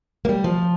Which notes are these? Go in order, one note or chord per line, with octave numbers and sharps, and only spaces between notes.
A#3
G3
F3